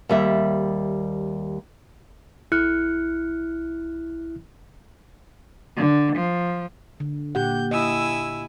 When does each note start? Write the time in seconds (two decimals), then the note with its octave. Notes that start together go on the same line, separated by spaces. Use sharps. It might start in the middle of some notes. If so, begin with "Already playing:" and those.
0.09 D#2 G3 E5
2.52 B1 E4 F6 F#6 C#7
5.78 D3
6.16 F3
7.00 D3
7.35 A#2 G4 F#5 G6
7.71 E4 D#5 G#5 E6